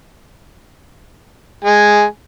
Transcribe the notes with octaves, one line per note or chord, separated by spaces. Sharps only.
G#3 G#5